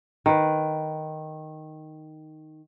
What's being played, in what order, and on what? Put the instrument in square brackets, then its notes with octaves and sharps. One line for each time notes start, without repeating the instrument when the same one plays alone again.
[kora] D#3 B4